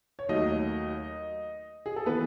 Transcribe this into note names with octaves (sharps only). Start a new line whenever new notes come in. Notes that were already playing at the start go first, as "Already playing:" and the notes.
C#5
D#2 D#3 F#3 A3 D#4 D#5
G#4
A4
E3 B3 B4